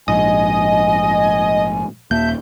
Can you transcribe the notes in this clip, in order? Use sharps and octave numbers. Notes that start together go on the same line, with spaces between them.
A#1 G#2 D#5 G#5
D#1 A#3 E5 A5 G6